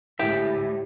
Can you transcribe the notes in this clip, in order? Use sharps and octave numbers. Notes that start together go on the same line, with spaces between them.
D2 A2 G#3 E4 G4 E5